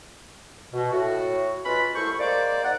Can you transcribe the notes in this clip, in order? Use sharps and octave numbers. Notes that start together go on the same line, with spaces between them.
B2
A2 F#4
G#3 C#4 F4 F#4 B4 B5
C2 A3 E4 C5 C#6
G#3 A#3 C5 D5
D#4 D5 F#5